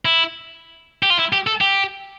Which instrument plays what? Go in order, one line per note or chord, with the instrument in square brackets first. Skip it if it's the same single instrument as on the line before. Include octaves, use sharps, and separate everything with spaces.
[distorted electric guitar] E4
G4
F4
E4
G4
A4
G4